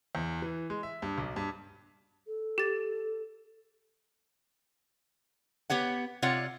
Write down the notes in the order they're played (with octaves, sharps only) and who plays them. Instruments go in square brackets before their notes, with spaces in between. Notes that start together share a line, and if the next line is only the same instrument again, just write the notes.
[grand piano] E2
E3
G#3
E5
G2
B1
G2
[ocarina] A4
[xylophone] G4 A6
[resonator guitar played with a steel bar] B3 G4 C#5 F#5
C3 F4 C#5 D5 F#5